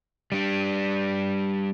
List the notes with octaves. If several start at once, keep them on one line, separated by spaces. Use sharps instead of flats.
G3 D4